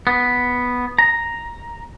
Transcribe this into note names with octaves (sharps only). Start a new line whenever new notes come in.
B3
A#5